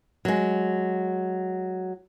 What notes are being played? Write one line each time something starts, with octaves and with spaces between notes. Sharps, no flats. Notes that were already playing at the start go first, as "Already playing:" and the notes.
F#3 G#3